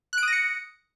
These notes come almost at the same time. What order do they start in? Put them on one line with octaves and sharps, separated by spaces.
F#6 D7 D#6 A#6 C#7